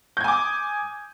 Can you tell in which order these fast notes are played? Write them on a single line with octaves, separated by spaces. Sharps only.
G6 G#6 G#5 D6 D#6